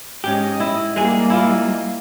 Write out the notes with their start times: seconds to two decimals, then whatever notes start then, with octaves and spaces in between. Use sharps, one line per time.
0.24 G#2 C#4 G4 D#5
0.60 E4
0.96 G3 G#3 A#3 G#4
1.30 E4 F4